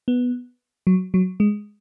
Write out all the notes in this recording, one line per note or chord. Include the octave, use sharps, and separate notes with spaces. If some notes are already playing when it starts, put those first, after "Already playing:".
B3
F#3
F#3
G#3